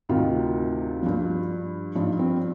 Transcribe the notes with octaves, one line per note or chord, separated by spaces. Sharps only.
D2 C3 D#3 F4
G2 F3
G2 F3 D#4
C4